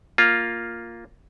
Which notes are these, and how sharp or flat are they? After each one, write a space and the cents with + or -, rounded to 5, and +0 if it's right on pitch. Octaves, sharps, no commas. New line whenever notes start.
A#3 +0 F4 +0